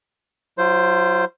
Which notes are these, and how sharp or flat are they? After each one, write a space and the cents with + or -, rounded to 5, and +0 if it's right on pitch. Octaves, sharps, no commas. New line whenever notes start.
F#3 +0 F4 -40 C5 +0